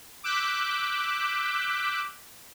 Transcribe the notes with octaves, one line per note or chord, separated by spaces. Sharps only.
D6 E6 F#6 G6 B6